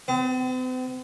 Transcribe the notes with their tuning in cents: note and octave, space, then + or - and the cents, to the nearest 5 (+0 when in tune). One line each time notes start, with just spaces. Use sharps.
C4 -45